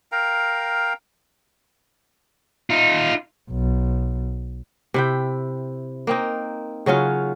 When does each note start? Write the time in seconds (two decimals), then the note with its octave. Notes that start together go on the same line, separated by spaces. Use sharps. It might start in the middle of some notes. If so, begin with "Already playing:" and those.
0.12 A#4 F5 G5 A#5
2.70 D#4 F4
3.51 B1
4.94 C3 E4 G5
6.07 A#3 C4 D#4
6.86 C#3 F#3 C#4 F4